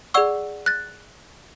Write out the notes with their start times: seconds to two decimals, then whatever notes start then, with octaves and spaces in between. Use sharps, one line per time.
0.14 G#4 D5 F#5 C#6 E6
0.66 F#6 A6